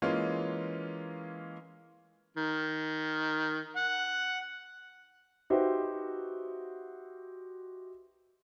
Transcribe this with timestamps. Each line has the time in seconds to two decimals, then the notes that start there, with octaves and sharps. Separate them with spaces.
0.02 E3 G#3 A#3 C#4 F4
2.37 D#3
3.76 F#5
5.50 D#4 F#4 G4 B4 C5 E5